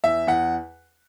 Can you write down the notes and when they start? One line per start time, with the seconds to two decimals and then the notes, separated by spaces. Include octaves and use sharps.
0.04 E2 E5
0.27 E2 F#5